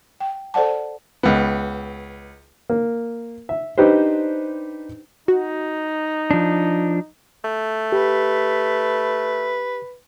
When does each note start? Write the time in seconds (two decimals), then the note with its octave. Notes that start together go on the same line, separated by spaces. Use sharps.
0.20 G5
0.54 A4 C5 D5 F#5 A5
1.23 C#2 B3
2.69 A#3
3.49 E5
3.78 D4 D#4 G4 B4 C5
5.28 D#4 F#4
6.31 F3 D4
7.44 A3
7.92 G4 B4